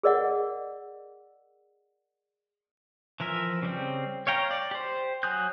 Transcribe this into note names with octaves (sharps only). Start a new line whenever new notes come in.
G#4 A#4 D5 D#5 F#5
E3 F3 A#4 E5
C#3 G3 C4
C#5 F5 G5 A#5
D5
G4 C5
F#3 G#5 D#6 F#6 G6